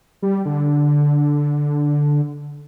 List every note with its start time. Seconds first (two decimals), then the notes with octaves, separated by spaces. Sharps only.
0.22 G3
0.45 D3